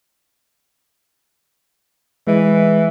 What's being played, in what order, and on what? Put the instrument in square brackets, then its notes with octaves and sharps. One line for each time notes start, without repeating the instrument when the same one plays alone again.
[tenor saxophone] E3 [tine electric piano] G#3